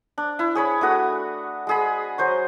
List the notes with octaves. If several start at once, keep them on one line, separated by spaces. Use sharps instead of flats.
D4
E4
G#4 C#5 B5
A3 D4 F#4 D#6
G#3 G#4 B5
F#3 C5 C#6